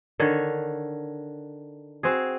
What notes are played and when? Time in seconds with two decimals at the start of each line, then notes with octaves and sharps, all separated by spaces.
0.20 D3 D#3 C#5
2.03 C4 F#4 G#4